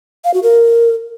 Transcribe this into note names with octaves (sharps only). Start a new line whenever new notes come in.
F5
F#4
A#4